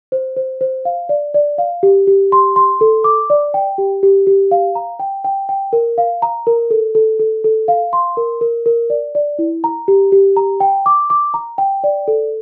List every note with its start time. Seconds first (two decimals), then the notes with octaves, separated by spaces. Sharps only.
0.12 C5
0.37 C5
0.61 C5
0.85 F5
1.09 D5
1.34 D5
1.58 F5
1.83 G4
2.07 G4
2.32 C6
2.56 C6
2.81 A4
3.04 D6
3.30 D5
3.54 G5
3.78 G4
4.03 G4
4.27 G4
4.51 F5
4.75 A#5
4.99 G5
5.24 G5
5.49 G5
5.73 A#4
5.98 F5
6.22 A#5
6.47 A#4
6.71 A4
6.95 A4
7.19 A4
7.44 A4
7.68 F5
7.93 C6
8.17 A#4
8.41 A#4
8.66 A#4
8.90 D5
9.15 D5
9.39 E4
9.64 A#5
9.88 G4
10.12 G4
10.37 A#5
10.60 G5
10.86 D6
11.10 D6
11.34 A#5
11.58 G5
11.84 D5
12.08 A4